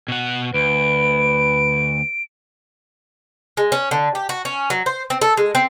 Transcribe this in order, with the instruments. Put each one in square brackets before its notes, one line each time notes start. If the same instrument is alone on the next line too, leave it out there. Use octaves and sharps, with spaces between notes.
[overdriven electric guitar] B2 F#5
[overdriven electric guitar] D2 [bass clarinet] B4 [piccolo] D7
[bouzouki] G#3
C#4
D3
G4
F#4
C#4
F#3
C5
C4
A4
G#3
C4